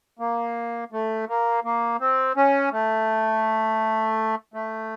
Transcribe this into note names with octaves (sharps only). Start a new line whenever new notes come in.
A#3
A3
A#3
A#3
C4
C#4
A3
A3